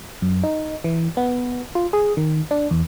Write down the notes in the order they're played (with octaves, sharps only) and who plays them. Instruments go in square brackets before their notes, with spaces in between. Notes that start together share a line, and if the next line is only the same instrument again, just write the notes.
[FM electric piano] F#2
D#4
E3
B3
F4
G#4
D#3
D4
E2